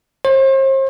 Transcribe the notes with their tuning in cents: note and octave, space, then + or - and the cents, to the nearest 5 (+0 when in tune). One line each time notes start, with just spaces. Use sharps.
C5 +40